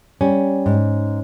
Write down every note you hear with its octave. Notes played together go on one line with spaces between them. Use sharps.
G3 C#4
G#2